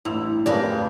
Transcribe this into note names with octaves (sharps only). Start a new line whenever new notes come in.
A1 G2 E4 E6 F7
F2 A2 C#3 G4 A#4 B4 D5